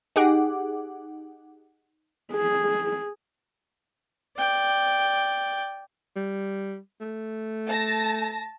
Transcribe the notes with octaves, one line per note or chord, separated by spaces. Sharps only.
D#4 G4 G#4 F#5 D6
G#4
D5 G5
G3
A3
A5 A#6